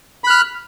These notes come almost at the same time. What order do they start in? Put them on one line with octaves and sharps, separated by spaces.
B5 F#6 F6